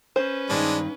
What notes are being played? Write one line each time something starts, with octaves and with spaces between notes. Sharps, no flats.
C#4 B4 C5
G2 D#3 G#3 D4